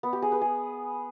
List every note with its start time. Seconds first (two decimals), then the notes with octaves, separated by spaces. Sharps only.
0.03 B3
0.13 G4
0.22 G#4
0.32 B4
0.42 G#4